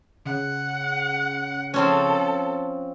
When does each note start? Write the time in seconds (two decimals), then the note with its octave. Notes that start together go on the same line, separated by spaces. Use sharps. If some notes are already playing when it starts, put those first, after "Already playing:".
0.25 C#3 F#5
1.74 F3 C4 C#4 A4